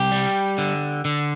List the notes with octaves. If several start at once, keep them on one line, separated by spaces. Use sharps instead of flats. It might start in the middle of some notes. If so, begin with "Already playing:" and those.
Already playing: C2 G4
G3
D3
D3